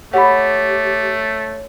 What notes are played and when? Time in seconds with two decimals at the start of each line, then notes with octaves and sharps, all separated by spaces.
0.14 A3 G4 C#5 F#5 B5